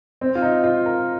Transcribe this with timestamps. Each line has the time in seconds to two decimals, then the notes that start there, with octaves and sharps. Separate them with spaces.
0.21 C4
0.35 F4
0.42 D#4
0.64 F4
0.86 A#4